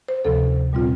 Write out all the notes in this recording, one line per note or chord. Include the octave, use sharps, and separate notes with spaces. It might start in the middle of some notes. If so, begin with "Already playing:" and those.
C5
D2 C3 F3 A4
A#2 G3 C4 F4